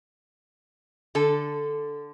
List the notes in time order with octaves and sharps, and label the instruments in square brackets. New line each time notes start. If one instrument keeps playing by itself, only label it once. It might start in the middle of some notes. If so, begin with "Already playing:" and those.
[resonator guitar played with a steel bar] D3 A4